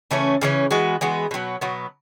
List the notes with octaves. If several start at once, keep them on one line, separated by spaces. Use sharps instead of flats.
C#3 E3 A3 C#4
C#3 E3 A3 C#4
E3 G#3 B3 F#4
E3 G#3 B3 F#4
B2 F#3 B3
B2 F#3 B3